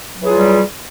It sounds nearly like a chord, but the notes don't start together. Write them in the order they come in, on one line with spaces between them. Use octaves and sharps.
F#3 E3 G#4 F4 G3